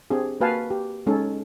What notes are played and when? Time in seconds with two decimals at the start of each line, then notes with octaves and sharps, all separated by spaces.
0.10 C4 D4 G4 G#4
0.40 A#3 F#4 B4 F5 G#5 A5
0.71 G4
1.07 G#3 C#4 D#4 A4